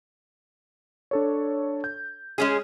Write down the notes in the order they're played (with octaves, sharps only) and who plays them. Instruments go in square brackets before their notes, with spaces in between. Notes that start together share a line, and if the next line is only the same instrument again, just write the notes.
[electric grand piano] D4 A4 C#5
G6
[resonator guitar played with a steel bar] G#3 C#4 G#4